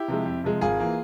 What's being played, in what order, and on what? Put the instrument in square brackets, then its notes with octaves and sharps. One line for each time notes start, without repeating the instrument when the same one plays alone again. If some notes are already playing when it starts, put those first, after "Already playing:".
Already playing: [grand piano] E4 G4
C3 F3 G#3
F2
C3 F3 G#3
G#1 F4 G#4
E3 A#3